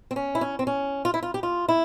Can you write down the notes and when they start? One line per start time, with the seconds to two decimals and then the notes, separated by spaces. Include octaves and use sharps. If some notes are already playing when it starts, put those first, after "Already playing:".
0.11 C4
0.16 C#4
0.35 E4
0.41 C#4
0.59 C4
0.67 C#4
1.05 F4
1.14 E4
1.23 F4
1.34 G4
1.43 F4
1.69 E4